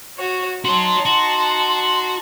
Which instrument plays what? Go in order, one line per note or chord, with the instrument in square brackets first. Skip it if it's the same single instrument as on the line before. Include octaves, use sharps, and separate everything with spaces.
[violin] F#4 C#5
[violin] D#4 A5 [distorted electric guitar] F#4 C#5 [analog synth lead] C6
[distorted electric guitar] F#4